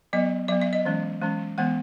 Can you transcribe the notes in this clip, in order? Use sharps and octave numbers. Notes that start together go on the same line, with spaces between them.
F#3 B3 D#5
F#3 B3 E5
E5
D#5
E3 G#3 C#4
E3 G#3 C#4
E3 G#3 B3 F#5